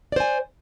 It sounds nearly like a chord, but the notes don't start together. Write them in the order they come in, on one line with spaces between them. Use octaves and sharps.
D5 C5 G#5